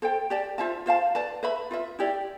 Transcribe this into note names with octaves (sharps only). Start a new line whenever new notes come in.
A4 C5 G5
G4 D5 A5
F4 C5 E5 A5
F4 C5 F5 A5
B4 D5 A5
B4 E5 B5
F4 B4 E5
E4 G4 D5